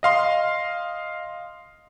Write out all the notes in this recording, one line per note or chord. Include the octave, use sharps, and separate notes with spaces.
D#5 F5 C6